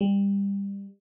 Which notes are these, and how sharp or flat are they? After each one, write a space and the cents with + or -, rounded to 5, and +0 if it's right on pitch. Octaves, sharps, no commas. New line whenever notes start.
G3 +25